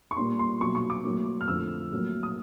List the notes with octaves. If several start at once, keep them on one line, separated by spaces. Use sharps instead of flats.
C#6
A#2 G3 A#3 C6
C6
B2 F#3 A#3 C#6
C#6
D6
A2 F#3 A#3
F6
F2 D3 F3 A3 E6
A2 F#3 A#3
D#6